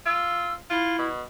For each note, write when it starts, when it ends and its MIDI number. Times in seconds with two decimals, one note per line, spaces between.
0.06 0.56 65
0.06 0.53 88
0.70 1.07 64
0.70 0.98 65
0.98 1.23 47